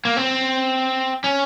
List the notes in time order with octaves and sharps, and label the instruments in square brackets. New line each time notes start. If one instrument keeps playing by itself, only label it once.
[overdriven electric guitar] A#3
C4
C#4